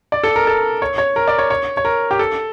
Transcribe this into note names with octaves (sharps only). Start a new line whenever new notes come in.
D5
A4
A#4
A4
C#5
C#5
A#4
D5
C#5
C#5
C#5
A#4
G4
A4